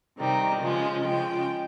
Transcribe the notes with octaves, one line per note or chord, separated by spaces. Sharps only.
C3 D#3 G3
C#3 F3 G#3
C#3 F3 G#3 G5